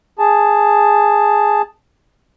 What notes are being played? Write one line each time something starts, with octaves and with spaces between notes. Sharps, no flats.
G#4 A5